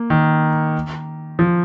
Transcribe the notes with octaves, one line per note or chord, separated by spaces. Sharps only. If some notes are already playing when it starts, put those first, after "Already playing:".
Already playing: A#3
D#3
F3